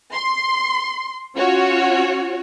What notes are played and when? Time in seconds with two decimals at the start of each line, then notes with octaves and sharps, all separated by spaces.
0.13 C6
1.38 C#4 F4 F#4 C#5